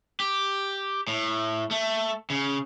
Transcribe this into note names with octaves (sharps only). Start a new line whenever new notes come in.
G4
A2
A3
C#3